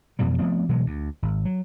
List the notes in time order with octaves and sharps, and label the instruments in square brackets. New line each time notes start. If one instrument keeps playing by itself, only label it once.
[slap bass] F2 B2 E3 G3
F3 A3 B3 C4
B2 E3 F#3 G#3
D2
G#1
F#3